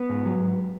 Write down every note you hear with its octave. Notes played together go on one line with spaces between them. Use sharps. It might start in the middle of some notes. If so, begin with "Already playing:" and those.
Already playing: B3 B4
G#2
F#3
G#2